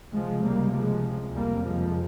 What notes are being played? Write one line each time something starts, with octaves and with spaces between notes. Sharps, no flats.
C#2 C3 F3 G#3
G3 A#3
F3 G#3
F2 C3 G3 A#3
F3 G#3